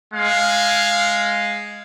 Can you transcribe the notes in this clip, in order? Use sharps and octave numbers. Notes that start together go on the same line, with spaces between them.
G#3 F5